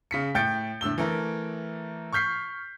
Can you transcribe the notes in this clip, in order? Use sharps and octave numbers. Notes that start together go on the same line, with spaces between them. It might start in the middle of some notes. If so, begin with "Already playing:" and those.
C#3 B6 C#7
A2 G5 G6 A6 C#7 D7
A2 D3 E6 G7
E3 A3 A#4
C#6 F6 G6 B6 C7